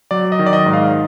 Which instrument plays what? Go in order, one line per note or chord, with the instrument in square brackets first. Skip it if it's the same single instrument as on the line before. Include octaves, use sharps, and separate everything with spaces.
[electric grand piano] F#3 D5
D#5
D#3
D5
D#5
G#2
F5